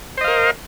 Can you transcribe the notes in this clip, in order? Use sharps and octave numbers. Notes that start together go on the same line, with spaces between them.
A#4 C5 D#5 F5